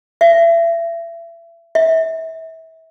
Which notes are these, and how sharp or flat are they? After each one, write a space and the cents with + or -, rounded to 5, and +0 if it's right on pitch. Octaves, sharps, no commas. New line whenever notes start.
E5 +30
E5 -30